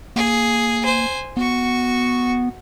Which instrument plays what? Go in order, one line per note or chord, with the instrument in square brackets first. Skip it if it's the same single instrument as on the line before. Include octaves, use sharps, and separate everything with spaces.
[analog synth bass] A#3 [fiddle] G#4
[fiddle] C5 G#5
[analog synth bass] B3 [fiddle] F#4 C#6